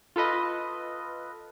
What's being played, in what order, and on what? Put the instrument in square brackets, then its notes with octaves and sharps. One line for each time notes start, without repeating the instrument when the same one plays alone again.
[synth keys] F4 A4 B4 D#5